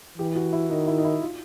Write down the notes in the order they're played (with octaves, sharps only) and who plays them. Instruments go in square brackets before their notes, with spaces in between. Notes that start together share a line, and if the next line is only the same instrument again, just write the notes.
[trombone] E3 [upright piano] G4
[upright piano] F#4
E4
[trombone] D#3 [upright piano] D#4
[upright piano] E4
D#4
E4
F4